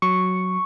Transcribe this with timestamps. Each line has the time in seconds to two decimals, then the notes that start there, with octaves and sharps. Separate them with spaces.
0.02 F#3 C#6